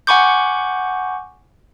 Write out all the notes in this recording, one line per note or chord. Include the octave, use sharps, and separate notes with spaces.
F#5 G#5 B5 C#6 D6 G6